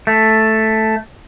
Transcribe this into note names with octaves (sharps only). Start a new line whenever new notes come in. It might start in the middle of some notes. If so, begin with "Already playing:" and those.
A3